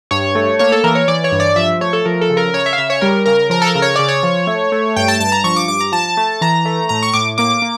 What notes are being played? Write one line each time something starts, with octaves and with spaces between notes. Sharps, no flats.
G2 C#5
A3
A#3 C#5
A4
E3 A#4
C#5
E3 D5
C#5
G2
D5
F3 E5
A3 C#5
A4
F3 A#4
A4
C#3
A#4
C#3 C#5
E5
F5
C#3 E5
C#5
G3 A#4
C#3 A#4
F3 A#4
A4
A#4
C#3
C#5
C#3 D5
C#5
F3
A3
A3
G2 G5
A5
G2 A5
A#5
F3 C#6
D6
G2 D6
A#5
F3 A5
A3
E3 A#5
A3
A2 A#5
C#6
A2 D6
A#3 D6
A#3